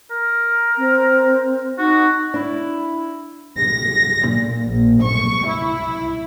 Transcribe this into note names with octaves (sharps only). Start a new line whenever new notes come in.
A#4
C4
D#4 F#4
D4 E4
A#6
A#2
A#1
C#6
E4